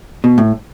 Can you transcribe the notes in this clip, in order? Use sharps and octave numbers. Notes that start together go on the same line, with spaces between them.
B2
A2